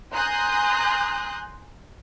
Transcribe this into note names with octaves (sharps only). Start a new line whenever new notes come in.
G#5 A#5 C6 D#6 F#6 G6